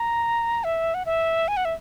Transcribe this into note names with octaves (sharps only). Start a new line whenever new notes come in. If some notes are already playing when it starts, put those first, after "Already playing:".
Already playing: A#5
E5
F#5
E5
G#5
F#5
E5